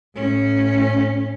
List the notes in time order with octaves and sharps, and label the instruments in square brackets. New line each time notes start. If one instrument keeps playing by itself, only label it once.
[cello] A2 C#4